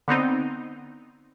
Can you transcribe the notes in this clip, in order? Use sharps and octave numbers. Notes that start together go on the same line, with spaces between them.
D3 B3 C4 D#4